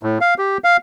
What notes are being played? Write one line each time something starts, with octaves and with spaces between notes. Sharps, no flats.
A2
F5
G4
F5